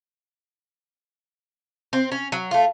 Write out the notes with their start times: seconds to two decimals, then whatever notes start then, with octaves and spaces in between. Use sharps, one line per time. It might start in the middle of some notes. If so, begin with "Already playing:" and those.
1.93 C4
2.12 C#4
2.32 F#3
2.51 A3 F4